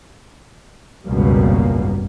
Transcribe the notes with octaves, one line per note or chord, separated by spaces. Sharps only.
G#1 C#2 F#2 B2 G3 A#3